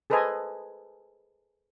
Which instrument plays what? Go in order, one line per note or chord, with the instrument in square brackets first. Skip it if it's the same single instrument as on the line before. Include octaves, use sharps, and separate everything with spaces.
[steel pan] G#4 A4 B4 C5 D#5 G#5